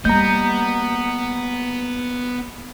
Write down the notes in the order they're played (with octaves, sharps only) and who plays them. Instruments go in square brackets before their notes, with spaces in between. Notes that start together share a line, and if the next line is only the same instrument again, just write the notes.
[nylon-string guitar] G3 D#5 [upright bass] A#3 [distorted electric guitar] B3 [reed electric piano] A#5 G6